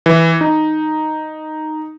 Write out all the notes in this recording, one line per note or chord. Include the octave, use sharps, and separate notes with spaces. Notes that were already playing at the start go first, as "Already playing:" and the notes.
E3
D#4